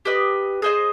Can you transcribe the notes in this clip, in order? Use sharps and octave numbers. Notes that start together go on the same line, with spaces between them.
G4 B4 D#5
G#4 C5 D#5